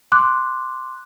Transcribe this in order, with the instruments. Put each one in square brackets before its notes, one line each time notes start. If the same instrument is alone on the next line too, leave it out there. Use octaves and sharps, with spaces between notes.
[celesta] C6 D6 F#6